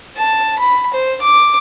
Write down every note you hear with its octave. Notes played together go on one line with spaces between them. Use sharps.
A5
B5
C5
D6